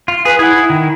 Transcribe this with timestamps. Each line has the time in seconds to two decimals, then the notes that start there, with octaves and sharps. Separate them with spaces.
0.08 F4
0.25 G#4 B4
0.39 E4 G#4 F#5
0.56 E4
0.70 D#3